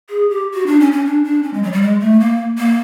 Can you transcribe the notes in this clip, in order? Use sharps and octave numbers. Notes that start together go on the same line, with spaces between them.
G#4
G4
F#4
D4
C#4
C#4
D4
D4
C#4
G#3
F#3
G3
G#3
A3
A#3
A#3